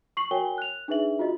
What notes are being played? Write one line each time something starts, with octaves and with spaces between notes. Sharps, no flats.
C#6 C7 F#7
F#4 A#4 C#5 G5 G#5 G7
F#6 F7
D4 D#4 G#4 B4 E5 F#7
F4 F#4 D#5